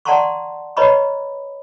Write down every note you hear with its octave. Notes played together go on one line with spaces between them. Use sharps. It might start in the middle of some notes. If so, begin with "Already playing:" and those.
D5 F#5 A5 A#5 C6 C#6
B4 C#5 D#5 A#5 B5 C#6